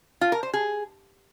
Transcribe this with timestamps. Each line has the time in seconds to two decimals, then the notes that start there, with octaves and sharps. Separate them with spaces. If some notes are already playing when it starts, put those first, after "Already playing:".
0.21 F4
0.32 A#4
0.43 C5
0.53 G#4